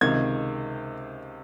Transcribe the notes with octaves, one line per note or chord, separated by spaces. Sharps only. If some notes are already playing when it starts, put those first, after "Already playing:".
C#2 C3 D#3 G#6